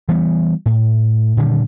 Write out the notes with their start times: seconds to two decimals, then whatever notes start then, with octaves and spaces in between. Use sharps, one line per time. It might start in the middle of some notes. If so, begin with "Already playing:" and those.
0.09 E3 G3 B3
0.66 A2
1.37 A#2 D3 D#3 G3